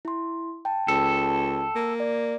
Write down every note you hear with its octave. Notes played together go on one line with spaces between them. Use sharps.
E4 C6
G5 A5
C#2 A4
A#3
D5